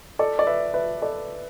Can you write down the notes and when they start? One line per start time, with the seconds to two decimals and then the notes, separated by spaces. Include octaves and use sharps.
0.19 A4 D5
0.39 D5
0.47 B4 E5
0.74 B4 E5
1.02 A4 D5